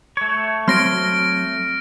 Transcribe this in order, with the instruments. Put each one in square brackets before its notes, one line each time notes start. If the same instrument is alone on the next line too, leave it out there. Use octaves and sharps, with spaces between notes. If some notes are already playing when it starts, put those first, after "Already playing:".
[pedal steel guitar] A3 C#5
[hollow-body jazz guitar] F#3 C4 C6 [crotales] F6 A#6 D7